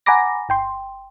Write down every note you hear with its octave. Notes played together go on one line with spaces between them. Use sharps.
F#5 G#5 A#5 B5 D6 A#6
G1 G5 C6